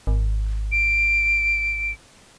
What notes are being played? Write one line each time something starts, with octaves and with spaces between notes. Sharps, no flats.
G#1
D7